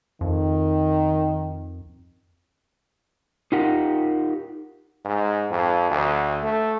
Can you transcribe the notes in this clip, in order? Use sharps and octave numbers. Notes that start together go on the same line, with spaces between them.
F2 D#3
D#4 F4 G4 A#4 F#5
G#2
F2
D2
A3